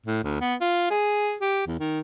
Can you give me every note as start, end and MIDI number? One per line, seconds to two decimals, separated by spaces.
0.06 0.19 45
0.24 0.40 38
0.41 0.55 59
0.61 0.88 65
0.90 1.35 68
1.41 1.63 67
1.67 1.77 40
1.79 2.00 51